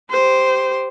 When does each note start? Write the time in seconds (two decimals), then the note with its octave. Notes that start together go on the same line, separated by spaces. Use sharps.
0.11 G4 C5